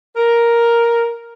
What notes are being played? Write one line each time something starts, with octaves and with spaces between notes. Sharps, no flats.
A#4